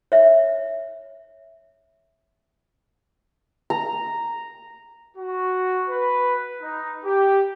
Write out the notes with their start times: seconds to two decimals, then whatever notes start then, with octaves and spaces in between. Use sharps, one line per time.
0.12 C#5 E5
3.70 A#5
5.17 F#4
5.89 B4
6.62 D#4
7.05 G4